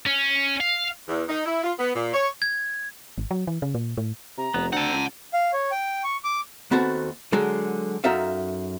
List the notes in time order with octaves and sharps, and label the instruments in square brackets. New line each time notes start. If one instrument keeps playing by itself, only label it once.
[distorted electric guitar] C#4
F5
[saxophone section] E2
D#4
E4
F4
B3
A#2
C#5
[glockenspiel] G#6
[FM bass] G#1
F#3
E3
C#3
A#2
A2
[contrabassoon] C3 [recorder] A#5
[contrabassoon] F1 [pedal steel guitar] B3
[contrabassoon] D2 [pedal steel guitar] C4 A4 [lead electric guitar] F#5 A5 [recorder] A#5
[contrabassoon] C#2
[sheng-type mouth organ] F5
C#5
G5
C#6
D6
[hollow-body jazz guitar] D#2 B3 C4 F#4 A4
D3 F#3 G#3 F#4 A4
F#2 D#4 F#4 A4 E5 F5